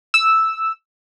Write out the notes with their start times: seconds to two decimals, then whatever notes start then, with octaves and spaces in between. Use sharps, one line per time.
0.14 E6